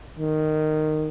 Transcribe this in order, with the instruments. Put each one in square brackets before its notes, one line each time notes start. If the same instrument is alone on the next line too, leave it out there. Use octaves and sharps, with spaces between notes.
[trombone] D#3